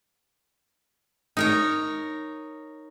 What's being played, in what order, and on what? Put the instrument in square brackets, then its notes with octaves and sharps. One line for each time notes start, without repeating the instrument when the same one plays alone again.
[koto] D#4 A#4 C#5